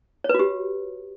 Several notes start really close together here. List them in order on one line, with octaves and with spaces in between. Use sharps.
C#5 B4 F#4 G4